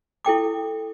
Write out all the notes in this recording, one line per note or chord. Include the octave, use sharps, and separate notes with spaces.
E4 A4 G5 D6